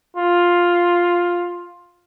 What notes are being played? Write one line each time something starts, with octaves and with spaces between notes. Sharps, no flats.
F4